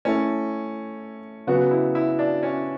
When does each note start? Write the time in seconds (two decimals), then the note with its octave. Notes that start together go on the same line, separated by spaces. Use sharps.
0.05 A3 C#4 E4 A4
1.47 C#3 F#3 B3 F#4
1.71 E4
1.95 E4
2.19 D4
2.43 C#4